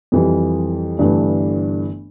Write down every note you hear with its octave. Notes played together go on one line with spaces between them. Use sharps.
F2 E3 G3
G1 G2 E3 A3 D4